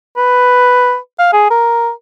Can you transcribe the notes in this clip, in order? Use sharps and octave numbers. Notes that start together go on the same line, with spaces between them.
B4
F5
G#4
A#4